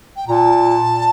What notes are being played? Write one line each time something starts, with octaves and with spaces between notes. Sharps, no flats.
G5
A#2 A#5
A5